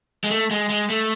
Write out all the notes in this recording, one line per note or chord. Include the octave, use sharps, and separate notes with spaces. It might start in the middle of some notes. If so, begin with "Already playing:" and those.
G#3
A3
G#3
G#3
A3